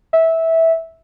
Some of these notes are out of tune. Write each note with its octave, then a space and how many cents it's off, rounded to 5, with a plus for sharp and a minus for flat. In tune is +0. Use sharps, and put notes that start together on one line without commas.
E5 -15